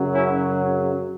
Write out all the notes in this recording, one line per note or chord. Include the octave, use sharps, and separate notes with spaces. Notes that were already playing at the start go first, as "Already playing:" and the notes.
Already playing: F#2 C#3 F#3
C#4 E4